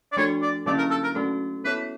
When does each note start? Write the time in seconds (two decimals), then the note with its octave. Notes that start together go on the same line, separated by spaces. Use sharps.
0.12 D5
0.17 F3 A3 D4 F#4 A4 C#5
0.42 D5
0.66 D3 F#3 A#3 C#4 E4 D5
0.78 A#4
0.90 A4
1.04 A#4
1.15 F#3 A3 C#4 F#4 A4
1.65 B3 E4 A4 B4 C#5